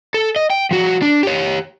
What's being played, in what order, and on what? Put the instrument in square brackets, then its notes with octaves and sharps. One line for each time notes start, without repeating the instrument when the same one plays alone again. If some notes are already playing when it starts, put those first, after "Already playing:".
[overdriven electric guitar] A4
D#5
G5
F3 F#4
D4
G4 C#5